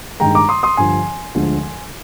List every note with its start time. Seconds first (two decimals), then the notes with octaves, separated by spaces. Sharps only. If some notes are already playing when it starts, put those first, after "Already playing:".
0.20 G2 D#3 G#3 G5 A#5
0.35 A#5 D6
0.49 C6 D#6
0.63 C6 D#6
0.77 G2 D3 F3 G#5 C6
1.35 D2 D3 F3 G#3